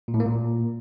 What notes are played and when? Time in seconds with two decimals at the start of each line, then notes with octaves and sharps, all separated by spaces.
0.08 A#2
0.14 A2
0.20 A#3
0.26 A#2